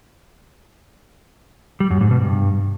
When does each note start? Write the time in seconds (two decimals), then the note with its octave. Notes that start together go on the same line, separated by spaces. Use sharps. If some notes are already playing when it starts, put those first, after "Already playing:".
1.80 G3
1.91 F#2
2.01 G#2
2.11 B2
2.21 G2